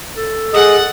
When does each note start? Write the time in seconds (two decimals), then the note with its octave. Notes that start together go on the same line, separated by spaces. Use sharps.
0.17 A4
0.54 G#4 D#5 F#5